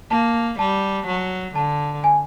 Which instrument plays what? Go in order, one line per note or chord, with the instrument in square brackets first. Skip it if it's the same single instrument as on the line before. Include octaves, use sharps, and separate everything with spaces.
[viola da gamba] A#3 [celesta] A5
[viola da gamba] G3 [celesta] A5
[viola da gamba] F#3
[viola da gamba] D3 [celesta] A5
[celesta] G#5